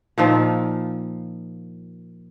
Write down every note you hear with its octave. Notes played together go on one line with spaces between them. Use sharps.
A#2 D#3 F3